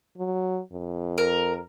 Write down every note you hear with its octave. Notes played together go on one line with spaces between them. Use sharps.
F#3
F2
A#4